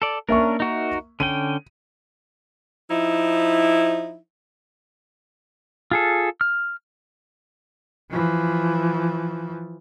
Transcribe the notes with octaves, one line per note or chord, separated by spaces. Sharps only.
A4 D5
A#3 C#4 D4 A#4 E5 C#6
D#4 F#4 A#4
D3 C#4 G5 D#7
F3 D#4 E4
F4 G#4 A4
F6
E3 F3